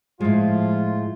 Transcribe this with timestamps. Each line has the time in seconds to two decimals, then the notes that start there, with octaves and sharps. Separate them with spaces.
0.20 A2 F3 G#3 F4